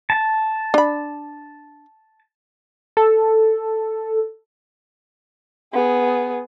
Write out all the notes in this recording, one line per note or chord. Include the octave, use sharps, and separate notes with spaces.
A5
D4 B5
A4
B3 G#4